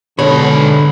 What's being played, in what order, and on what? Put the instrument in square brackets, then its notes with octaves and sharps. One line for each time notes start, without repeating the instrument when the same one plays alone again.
[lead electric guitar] G#2 B5 [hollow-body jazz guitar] B2 C#5 [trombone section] D3